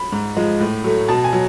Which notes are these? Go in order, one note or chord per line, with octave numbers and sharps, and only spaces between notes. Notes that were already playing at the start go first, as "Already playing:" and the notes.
Already playing: B5
G#2
F3 G#3
A2
F#3 A3
B2 A5
G#5
F#3